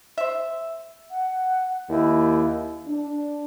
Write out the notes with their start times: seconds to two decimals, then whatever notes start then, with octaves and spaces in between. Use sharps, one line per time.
0.18 C5 E5
1.11 F#5
1.89 D#2 E4
2.86 D4